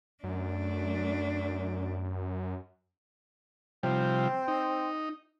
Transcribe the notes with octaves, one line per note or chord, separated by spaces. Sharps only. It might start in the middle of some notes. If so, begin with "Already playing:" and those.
F#2 A3 D4
C3 F3 G3 C4
D#4